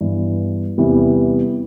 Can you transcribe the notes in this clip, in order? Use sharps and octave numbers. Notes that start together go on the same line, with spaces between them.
G2 E3 B3
E2 C3 E3 G3 B3